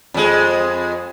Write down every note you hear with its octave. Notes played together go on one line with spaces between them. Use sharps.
F2 G#3